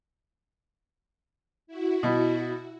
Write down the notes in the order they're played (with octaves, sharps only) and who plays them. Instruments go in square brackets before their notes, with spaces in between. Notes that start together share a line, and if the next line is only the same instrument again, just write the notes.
[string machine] E4 F#4
[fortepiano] B2